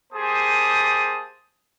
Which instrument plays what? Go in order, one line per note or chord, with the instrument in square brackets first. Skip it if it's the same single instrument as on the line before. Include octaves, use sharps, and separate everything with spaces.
[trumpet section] A#3 G4 G#4 C5 A5 D#6